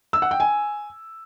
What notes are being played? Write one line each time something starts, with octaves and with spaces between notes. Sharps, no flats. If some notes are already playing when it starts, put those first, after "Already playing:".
E6
F#5
G5
G#5